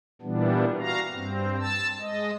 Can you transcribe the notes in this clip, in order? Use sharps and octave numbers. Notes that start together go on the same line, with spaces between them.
A#2 E3 G3 B3 D4
F#4 F5 A#5
G2 C4
A5 E6
G#3 D#5